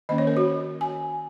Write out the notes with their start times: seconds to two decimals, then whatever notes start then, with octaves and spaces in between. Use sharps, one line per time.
0.09 D#3 A#3 C#4 D#5
0.18 C#5
0.27 A#4
0.37 F#4
0.81 G#5